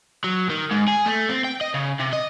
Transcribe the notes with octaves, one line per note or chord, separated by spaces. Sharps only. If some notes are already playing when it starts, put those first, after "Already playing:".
F#3
D#3
G#2
G#4
A3
C4
G5
D#5
C#3
C3
D#5